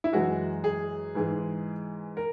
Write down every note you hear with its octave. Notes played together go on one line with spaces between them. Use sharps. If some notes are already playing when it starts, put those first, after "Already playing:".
E4
F#2 E3 G#3 F#4
G#4
G#2 E3 G#3
A#4